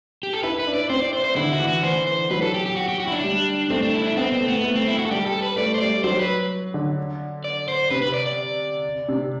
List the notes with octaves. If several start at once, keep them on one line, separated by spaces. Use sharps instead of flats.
G4
A4
E4 B4
B4
D4
D5
C4 C5
D5
C5
C5
D3 E4
F#4
E3
F#4
E3 C5
C5
F#3 B4
A4
G4
G4
F#4
G4
F#4
E4
D4
G3
A3 C4
D4
E4
D4
B3 C4
C4
A3
B3
A3
C4
E4
F#4
A4
G3 G4
A4
B4
A3 D5
C5
G3 D5
F#3 C5
B4
D3
D5
C5
C3 B4
B4
D5
D5
C3